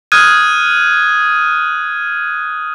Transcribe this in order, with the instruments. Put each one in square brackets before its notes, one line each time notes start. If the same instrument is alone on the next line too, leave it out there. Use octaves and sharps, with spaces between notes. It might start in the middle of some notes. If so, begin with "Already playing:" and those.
[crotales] D#6 F6 F#6 G#6 D#7